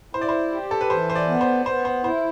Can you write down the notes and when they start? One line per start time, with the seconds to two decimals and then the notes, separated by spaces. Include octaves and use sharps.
0.13 E4 C5
0.21 D5
0.29 C5
0.52 G4
0.71 A4
0.81 B4
0.90 E3 C5
1.10 C5
1.15 D5
1.28 B3
1.41 C5
1.66 B3 C5
1.85 C5
2.04 E4 C5